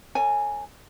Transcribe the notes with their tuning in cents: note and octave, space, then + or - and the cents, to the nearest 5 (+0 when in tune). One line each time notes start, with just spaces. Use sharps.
A4 +45 C#5 +0 G#5 -5